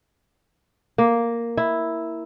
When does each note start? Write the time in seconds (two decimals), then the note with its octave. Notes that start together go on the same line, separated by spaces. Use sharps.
0.98 A#3
1.57 E4